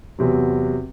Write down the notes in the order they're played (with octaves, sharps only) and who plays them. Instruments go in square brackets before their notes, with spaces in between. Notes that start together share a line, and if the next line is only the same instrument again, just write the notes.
[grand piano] E2 C3 F#3